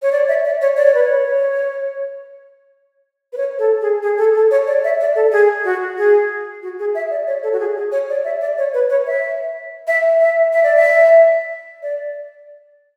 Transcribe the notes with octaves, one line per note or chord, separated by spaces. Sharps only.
C#5
D5
E5
D5
C#5
D5
C#5
B4
C#5
B4
C#5
A4
G#4
G#4
A4
A4
C#5
D5
E5
D5
A4
G#4
F#4
G#4
F#4
G#4
E5
D5
C#5
A4
F#4
G#4
G#4
C#5
D5
E5
D5
C#5
B4
C#5
E5
E5
E5
E5
D5
E5
D5